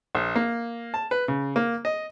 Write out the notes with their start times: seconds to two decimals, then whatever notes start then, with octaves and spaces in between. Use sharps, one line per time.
0.15 A#1
0.35 A#3
0.94 A5
1.11 B4
1.28 C#3
1.56 A#3
1.85 D#5